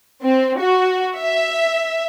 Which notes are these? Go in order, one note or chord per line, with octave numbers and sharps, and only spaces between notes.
C4
F#4
E5